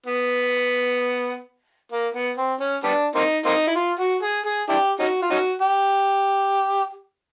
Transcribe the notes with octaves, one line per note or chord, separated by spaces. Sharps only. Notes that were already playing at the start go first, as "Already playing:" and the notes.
B3
A#3
B3
C4
C#4
G3 B3 D4
A#3 C4 D#4
A#3 C4 D#4
E4
F4
F#4
G#4
G#4
D4 E4 G4
C#4 D#4 F#4
F4
C#4 D#4 F#4
G4